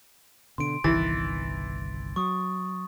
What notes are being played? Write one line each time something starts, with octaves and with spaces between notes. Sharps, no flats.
B2 D3 C6 D7
G1 C2 D#3 E3 A6
F#3 C#6 D#6